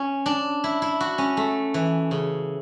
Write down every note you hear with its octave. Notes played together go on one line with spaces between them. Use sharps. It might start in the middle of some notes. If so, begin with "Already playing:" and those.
Already playing: C#4
D4
E4
E4
F#4
C#4
A3
E3
C#3